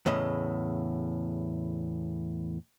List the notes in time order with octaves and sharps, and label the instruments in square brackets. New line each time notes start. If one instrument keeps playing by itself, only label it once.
[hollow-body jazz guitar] E2 A2 C#3 D#5